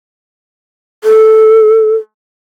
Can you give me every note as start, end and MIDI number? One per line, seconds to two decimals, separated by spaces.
1.04 1.95 69